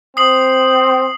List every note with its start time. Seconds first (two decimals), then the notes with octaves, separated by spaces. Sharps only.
0.17 C4 D#6 C7 F#7